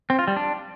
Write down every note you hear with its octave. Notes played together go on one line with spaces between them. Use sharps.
C4
F4
G3
D4